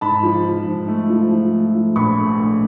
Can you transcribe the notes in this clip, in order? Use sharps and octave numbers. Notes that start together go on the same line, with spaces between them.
G#2 A5 B5
F3
F3
G#2
A3
F3
F3
A3
F3
A#1 B5 C#6
A3
A#1